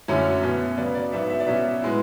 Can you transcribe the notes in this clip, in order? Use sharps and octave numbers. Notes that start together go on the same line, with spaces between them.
F#2 D3 F#3 A3 C#4
B2 A3 C#4
C#3 F#3 B3 D5
D5
G#2 F#3 B3 E5
E5
D5
B2 F#3 C#4 E5
A2 G#3 B3